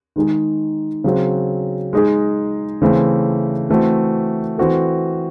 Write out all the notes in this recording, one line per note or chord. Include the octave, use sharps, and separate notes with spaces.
D#3 G#3 D#4 G#4
C#3 F#3 C4
G#3 D#4 G#4
C#3 E3 A3 C4
E3 A3 C4 F#4
E3 C4 F#4 A4